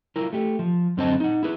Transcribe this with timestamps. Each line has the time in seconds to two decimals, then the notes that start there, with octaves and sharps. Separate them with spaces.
0.16 E4 F4 A#4
0.33 A3 G4
0.59 F3
0.97 F#2 D3 C4 C5 D#5 A5
1.20 D#4 F#5
1.43 E4 G#4 B4